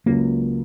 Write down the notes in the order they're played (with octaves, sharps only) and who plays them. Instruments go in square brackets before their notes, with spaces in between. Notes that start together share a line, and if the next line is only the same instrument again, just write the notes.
[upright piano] C#2 C#3 F#3 [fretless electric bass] A#3